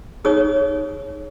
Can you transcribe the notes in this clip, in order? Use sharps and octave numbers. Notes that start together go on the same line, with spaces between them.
D#4 G#4 C#5 D#6